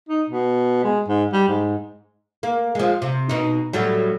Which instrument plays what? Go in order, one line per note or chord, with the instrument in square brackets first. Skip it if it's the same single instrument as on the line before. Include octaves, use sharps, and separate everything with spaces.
[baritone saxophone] D#4
B2
G#3
G#2
G3
G#2
[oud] A#3
F3 G#3
C3
B2 D#4
A2 F#3 G3